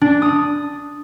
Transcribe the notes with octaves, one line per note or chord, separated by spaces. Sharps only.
D4
D#6